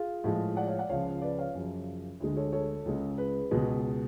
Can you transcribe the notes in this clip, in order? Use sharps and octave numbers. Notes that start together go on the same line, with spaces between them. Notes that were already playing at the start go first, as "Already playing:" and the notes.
Already playing: F4 G#4
A2 F3 G#3
D5 F#5
C#5 F5
D5 F#5
C#2 C#3 F3 C#5 F5
B4 D5
C#5 F5
F#2 C#3 F3
D2 D3 G#3
A4 C#5
A4 C#5
C#2 C#3 G#3
G#4 B4
C#2 B2 G#3